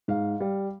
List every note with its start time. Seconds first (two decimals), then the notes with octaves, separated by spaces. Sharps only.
0.08 G#2 F5
0.40 G3